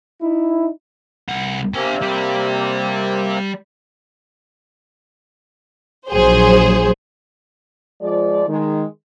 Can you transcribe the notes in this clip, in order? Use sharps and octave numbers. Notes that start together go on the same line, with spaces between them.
D#4 E4
C2 F#5
C3 A#3 C4 D4 G#5
G3
A#1 F#3 G#4 C5
F3 G#3 D5
D#3 G#3